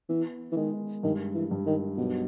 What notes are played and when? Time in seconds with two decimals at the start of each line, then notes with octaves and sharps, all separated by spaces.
0.09 E3 B3
0.52 E3
0.56 D#3 G#3
1.03 G2 D#3
1.35 E3
1.51 G2
1.66 D#3
1.98 B1 B2